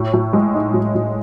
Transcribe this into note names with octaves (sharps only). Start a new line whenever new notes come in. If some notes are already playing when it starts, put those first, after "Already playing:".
Already playing: A2
A2
G#3
D#4
A2
A2